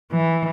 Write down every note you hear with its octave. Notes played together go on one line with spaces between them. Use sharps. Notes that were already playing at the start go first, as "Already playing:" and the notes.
E3